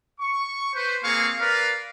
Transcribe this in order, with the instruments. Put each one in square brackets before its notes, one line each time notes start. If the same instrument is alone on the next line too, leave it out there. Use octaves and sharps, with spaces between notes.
[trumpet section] C#6
B4 C5
A#3 C4 G#4 F5 C#6
A#4 B4 D5 F5